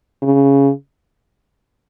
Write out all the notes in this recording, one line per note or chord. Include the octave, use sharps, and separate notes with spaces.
C#3